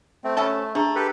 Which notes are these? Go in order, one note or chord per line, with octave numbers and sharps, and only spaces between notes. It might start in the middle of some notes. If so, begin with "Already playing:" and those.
A3 C4
C3 A3 C#4 A4 B5 E6 A6
A3 D4 G#4 A#5
G4 A4 B4